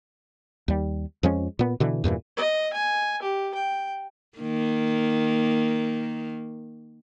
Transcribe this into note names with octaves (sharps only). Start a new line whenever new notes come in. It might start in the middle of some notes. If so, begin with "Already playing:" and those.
D#2 G3
F2 F3 G#3 C#4
A#2 B3
B2 D3 E3
E2 G2 A#2 E3
D#5
G#5
G4
G5
D#3 A#3